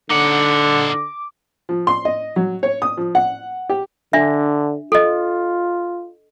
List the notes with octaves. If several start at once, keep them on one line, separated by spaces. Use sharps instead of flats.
D3 D#4 F#5 D6
F3
C6
D#5
F#3
C#5
D#6
F3
F#5
G4
D3 D4 E5
F4 A4 D#5